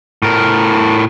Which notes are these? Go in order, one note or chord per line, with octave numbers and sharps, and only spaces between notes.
A2 A#4